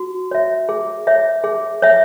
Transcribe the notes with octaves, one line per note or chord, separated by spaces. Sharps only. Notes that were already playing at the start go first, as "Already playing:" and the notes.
Already playing: F#4
C#5 E5
G#4
C#5 E5
G#4
C#5 E5